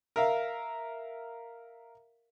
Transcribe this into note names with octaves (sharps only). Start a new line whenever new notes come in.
A#4 E5 F5